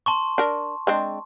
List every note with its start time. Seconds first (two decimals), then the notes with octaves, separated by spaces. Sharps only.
0.06 A5 C6 C#6
0.38 D4 A#4
0.87 G#3 C4 D4